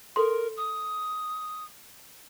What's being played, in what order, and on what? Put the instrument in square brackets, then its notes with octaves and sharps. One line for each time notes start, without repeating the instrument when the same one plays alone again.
[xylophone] A4 C6 [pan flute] A#4
[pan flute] D#6